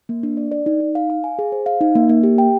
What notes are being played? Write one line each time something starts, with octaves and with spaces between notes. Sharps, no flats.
A#3
D4
D5
D5
D#4
D#4
F5
F5
G#5
G#4
C5
F5
D#4
A#3
A#3
G4
G5